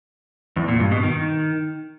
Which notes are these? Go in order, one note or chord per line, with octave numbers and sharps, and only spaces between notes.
E2
A#2
G2
B2
D#3